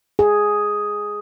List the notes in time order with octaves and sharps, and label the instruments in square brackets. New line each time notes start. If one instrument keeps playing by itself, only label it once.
[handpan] G#4